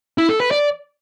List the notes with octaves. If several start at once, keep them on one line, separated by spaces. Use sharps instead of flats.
E4
A4
B4
D5